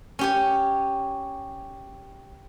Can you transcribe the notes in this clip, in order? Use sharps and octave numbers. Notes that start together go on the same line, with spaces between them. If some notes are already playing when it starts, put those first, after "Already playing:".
C#4 G4 C#5